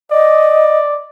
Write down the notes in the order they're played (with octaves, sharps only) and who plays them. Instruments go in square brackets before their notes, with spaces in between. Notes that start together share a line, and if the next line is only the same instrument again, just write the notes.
[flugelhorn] D5 [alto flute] D#5